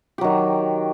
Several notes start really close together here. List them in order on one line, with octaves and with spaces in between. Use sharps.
G4 F#3 D#3